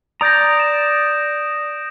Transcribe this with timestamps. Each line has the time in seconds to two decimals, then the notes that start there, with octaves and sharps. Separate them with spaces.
0.21 D5 A#5 D#6 G6 A#6
0.57 D7 E7